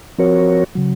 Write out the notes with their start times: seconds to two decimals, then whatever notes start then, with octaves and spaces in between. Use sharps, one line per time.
0.18 F3 C4 F#4 A#4 C#5
0.75 C#3 F#3